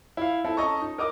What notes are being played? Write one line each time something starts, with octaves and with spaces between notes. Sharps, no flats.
E4 F5
C4 E4 A4
C#4 A4 D#5 A5 A#5 C#6
D#4
A#4 D#5 D6 D#6